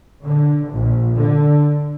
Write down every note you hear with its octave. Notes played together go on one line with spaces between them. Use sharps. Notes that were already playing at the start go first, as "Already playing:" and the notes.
D3
A#1
D3